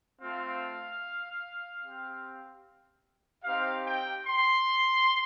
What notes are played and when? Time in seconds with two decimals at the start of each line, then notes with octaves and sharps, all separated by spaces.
0.20 A3 C4 F4 F5
1.82 C4 G4
3.44 C4 D#4 G4 F5
3.85 G5
4.25 C6